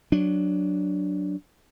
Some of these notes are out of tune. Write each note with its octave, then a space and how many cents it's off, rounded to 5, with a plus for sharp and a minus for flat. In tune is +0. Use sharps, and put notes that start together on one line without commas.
F#3 +0 D4 +0